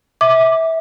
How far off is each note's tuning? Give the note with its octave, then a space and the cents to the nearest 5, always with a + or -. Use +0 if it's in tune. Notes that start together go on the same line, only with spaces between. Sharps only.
E5 -20 D6 +5